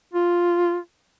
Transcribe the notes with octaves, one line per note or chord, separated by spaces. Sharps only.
F4